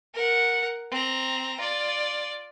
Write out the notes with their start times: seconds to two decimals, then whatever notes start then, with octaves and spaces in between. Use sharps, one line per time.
0.14 A#4 F#5
0.91 C4 A#5
1.60 F4 D5